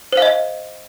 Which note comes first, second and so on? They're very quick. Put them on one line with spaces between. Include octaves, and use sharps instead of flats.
C5 F5 D#5